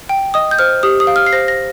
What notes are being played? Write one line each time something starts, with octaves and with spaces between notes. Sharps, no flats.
G5
D#5 D#6
G6
C5 F6
G4 D#6
D#6
F5
F6
C7
C5 A#6
A#6